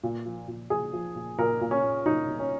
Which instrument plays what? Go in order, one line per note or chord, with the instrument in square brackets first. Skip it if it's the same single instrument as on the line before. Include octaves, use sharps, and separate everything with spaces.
[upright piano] A#2
F3
A#2
A#2 G#4
F3
A#2
A#2 A#4
A#2
C#4
A#2
A#2 D#4
A#2
C#4